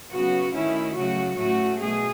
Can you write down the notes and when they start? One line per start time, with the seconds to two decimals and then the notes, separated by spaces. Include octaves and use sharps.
0.11 C#3 F#3 B3 F#4
0.54 D#3 A3 C#4 E4
0.97 C#3 F#3 A3 F#4
1.39 A2 F#3 A3 C#4 F#4
1.81 B2 A3 G#4